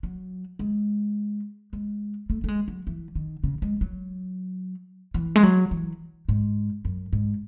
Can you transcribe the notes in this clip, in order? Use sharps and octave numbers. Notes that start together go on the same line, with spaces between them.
F#3
G#3
G#3
A3
A3
G#3
F#3
E3
D#3
C#3
G#3
F#3
E3
G#3
F#3
E3
G#2
F#2
G#2